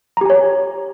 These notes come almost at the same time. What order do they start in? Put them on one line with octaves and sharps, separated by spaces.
A#5 G4 G#5 C#5